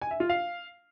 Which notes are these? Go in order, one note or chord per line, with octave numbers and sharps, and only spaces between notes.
G#5
E5
F4
F5